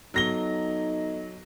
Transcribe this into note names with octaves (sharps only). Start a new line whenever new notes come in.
F#3 B3 D#4 A4 A#6 G7